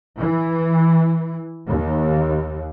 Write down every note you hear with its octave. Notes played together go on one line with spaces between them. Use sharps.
E3
D#2